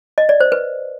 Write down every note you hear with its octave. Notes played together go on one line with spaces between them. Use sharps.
D#5
D5
C5
B4